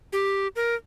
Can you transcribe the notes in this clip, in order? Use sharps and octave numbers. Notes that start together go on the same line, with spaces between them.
G4
A#4